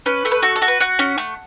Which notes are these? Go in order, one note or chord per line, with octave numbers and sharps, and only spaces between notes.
C#4 B4
A3
B4
F#4 A4
A4
F#4
B4
F#4 F#5
C#4
A3